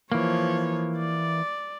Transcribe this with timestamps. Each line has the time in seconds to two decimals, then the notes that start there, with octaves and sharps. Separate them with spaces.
0.12 E3 F3 A#3 C#5
0.98 D5